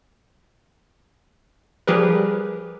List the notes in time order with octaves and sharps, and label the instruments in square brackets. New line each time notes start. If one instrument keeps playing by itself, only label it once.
[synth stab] F3 G3 G4 G#4 A#4 B4